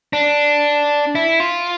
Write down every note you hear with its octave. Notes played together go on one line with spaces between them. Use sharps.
D4
E4
F4